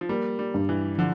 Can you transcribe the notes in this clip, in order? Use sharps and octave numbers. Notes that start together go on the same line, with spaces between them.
F3
G3 A#3
G3
G2
E3
D3 F3